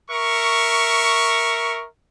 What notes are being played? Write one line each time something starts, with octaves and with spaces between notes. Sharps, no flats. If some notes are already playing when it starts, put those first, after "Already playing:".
A#4 E5 C#6